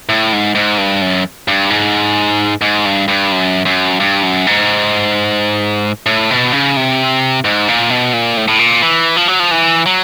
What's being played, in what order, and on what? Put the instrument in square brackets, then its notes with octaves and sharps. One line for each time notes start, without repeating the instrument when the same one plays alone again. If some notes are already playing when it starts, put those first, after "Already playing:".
[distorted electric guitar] A2
G#2
G#2
G2
F#2
G2
G#2
G#2
G2
G2
F#2
F#2
G2
F#2
G#2
A2
B2
C#3
C3
G#2
A#2
B2
A#2
A2
A2
A#2
E3
F3
F#3
F3
E3
F#3